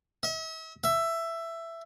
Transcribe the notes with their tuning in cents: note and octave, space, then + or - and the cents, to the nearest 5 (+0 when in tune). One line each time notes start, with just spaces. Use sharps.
E5 -45
E5 +10